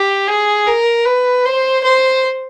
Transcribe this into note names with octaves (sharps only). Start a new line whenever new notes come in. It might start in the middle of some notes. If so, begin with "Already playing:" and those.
Already playing: G4
G#4
A#4
B4
C5
C5